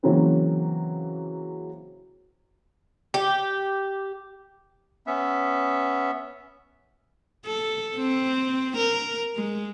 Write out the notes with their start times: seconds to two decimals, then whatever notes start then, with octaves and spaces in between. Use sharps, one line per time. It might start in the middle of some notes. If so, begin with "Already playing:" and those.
0.03 C#3 E3 F#3 A#3 C4 C#4
3.14 G4
5.07 B3 C#4 E5
7.45 A4
7.97 C4
8.77 A#4
9.36 G#3